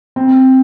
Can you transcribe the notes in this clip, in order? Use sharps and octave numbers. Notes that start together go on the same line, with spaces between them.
C4